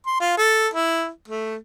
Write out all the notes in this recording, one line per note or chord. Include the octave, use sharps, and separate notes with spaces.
C6
F4
A4
E4
A3